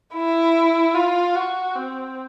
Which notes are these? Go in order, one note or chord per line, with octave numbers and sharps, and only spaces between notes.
E4
F4
F#4
C4